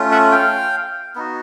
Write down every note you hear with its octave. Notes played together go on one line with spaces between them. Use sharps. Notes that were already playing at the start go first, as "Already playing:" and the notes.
Already playing: A3 C#4 F4
E5 F#5
F5 G5
B3 D#4 F#4